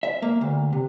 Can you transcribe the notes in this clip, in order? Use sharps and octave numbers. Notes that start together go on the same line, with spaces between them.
E5
A#3
D2
C3